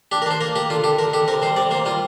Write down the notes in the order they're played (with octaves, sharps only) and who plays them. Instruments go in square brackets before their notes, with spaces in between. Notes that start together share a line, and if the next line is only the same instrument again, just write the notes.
[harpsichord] D4 G4
A#4
D4 C5
A#3 A#4
A#3 G4
D3 F4
D3 G4
D3 A#4
D3 G4
C3 A#4
G3 C5
C3 D5
A#3 C5
G3 F4